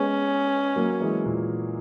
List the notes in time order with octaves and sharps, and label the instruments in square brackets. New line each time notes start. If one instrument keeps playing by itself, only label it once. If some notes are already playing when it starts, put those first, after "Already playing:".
Already playing: [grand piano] G#3 B3 [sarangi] C#4
[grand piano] F#3 A#3
E3 G#3
A#2